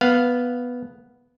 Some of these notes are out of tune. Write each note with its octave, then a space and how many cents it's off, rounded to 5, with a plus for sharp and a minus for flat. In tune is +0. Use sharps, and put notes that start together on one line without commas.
B3 +0 F5 +0